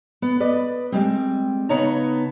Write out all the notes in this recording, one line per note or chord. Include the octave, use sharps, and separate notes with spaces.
B3
B4 D5 D#5
G3 G#3 C4
C#3 B3 D#4 C#5 A5 A#5